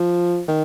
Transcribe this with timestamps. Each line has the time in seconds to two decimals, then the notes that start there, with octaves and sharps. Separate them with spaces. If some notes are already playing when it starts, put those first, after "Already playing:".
Already playing: F3
0.48 D#3